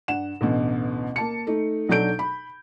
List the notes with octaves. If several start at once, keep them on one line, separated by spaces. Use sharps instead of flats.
G2 F#5 E7
A1 D2 B2
A#3 A5 C#7
A3 D#4
B1 F#3 D4 A4 G6 D7
B5